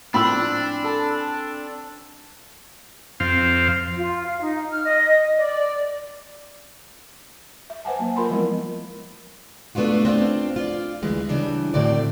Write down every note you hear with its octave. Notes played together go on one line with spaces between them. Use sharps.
A2 F3 C4 D4 G#5 B5 E6
A4
F2 C4 F5
F4
F5
D#4
F6
D#5
D5
E5
B4 C5 F#5 G#5 A5
F#3 A#3
F4 A#4 B5 C6
F3 F#3 G#3 B3 E4
A3 B3 D4 F4 F#4
C4 D4 F4
F4 D5
D2 E3 G#3 B3
C#3 E3 G3 D4
A2 D3 C4 F#4 D5